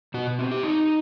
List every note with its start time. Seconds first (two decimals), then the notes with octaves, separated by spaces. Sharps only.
0.14 B2 F#4
0.39 C4
0.51 G4
0.63 D#4